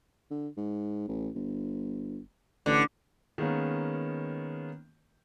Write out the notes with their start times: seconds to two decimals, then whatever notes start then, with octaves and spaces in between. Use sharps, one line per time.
0.31 D3
0.57 G#2
1.08 A1
1.35 G1
2.66 A1 D3
3.38 D#3 G#3 A#3 B3 C#4